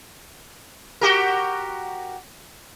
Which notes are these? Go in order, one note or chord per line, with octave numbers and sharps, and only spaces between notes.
F#4 G4 A#4